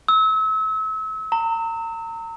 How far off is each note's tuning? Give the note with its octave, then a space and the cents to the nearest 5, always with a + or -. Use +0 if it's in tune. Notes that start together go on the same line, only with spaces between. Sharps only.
E6 -35
A#5 -35